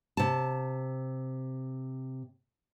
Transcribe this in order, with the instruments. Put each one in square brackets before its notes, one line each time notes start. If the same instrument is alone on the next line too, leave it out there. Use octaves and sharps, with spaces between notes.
[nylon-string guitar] C3 A5